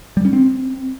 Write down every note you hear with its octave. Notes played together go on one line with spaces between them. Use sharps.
G3
C#4
C4